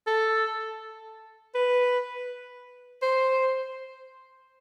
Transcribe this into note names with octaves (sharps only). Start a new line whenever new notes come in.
A4
B4
C5